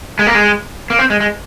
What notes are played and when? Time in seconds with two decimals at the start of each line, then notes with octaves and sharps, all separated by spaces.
0.19 G#3
0.27 A#3
0.35 G#3
0.90 A#3
0.99 C4
1.10 G#3
1.20 G#3